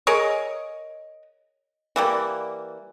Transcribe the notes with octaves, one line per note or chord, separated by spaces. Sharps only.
G#4 A#4 C#5 D#5
E3 G3 A#3